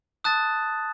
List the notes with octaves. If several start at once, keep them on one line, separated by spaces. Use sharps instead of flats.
A5 D#6 F#6 A6